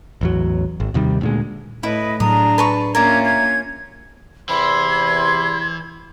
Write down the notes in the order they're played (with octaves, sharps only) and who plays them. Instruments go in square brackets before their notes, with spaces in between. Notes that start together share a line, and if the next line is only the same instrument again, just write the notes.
[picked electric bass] A1 E2 F#3
G#1
D#2 C3 D#3 G3
D2 A#2 G#3
[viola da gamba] A2 B4 [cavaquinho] E4 [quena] D#5
[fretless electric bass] A2 F#3 [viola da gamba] D4 G#4 [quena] A#5 [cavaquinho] D#6
[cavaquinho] B4 A5 C#6
[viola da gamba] A#3 C#4 F4 [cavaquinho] A#4 D5 E5 [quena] G#6
[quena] G#6
[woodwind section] E2 C3 C6 [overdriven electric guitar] E3 [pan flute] B5 [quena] G#6